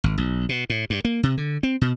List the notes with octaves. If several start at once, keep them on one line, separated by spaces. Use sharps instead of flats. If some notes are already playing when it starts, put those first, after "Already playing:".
G#1
B1
B2
A2
G2
A#3
C3
D3
C4
B2